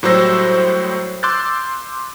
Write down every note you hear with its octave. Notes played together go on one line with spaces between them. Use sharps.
A2 F#3 G3 C5 E6 A#6
C6 D6 E6 F#6 G6 A6